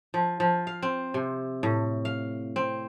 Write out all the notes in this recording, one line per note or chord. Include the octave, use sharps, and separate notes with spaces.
F3
F3
F5
C4
C3
A2
F5
C4